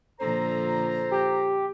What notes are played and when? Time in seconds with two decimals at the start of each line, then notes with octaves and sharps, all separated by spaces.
0.20 A#2 D3 F3 A4 C5 A#5
1.11 G4